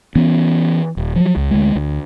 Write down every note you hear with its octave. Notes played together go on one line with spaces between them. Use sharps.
E3 B3 C#4
D#1
F3 F#3
C#2
D2 G#3
D2